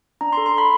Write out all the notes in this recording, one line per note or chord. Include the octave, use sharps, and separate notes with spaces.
D4 A#5
C6
A4
C6
A4 B5